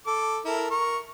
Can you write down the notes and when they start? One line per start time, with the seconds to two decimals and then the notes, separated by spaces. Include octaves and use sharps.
0.06 A4 D6
0.45 E4 A4 A#4
0.70 A#4 C#6